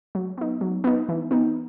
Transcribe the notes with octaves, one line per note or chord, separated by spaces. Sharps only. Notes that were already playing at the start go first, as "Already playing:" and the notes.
F#3
B3 D#4
F#3
B3 D#4
E3
B3 D#4